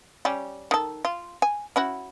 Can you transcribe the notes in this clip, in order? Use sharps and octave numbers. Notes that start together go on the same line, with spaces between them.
G3 C#4
D#3 A4
F4
G#5
C#4 E4 F#4